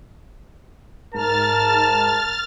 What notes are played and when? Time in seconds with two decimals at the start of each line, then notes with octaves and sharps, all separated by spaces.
1.14 G#2 A#4 A5 F6 A6